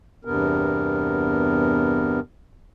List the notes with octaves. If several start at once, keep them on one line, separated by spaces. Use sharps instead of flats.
E2 G2 C3 B3 A#4